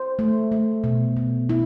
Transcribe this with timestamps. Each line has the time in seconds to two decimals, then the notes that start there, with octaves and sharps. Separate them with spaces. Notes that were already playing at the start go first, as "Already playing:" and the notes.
Already playing: C5
0.19 A3
0.52 A3
0.84 B2
1.17 B2
1.49 E4